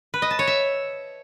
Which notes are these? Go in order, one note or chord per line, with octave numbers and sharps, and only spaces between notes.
B4
D#5
A5
C#5
E5